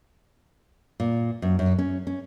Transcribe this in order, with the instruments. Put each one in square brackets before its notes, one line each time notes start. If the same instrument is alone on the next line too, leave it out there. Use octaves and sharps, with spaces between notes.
[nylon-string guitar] A#2
F#2
F#2
C#4
C#4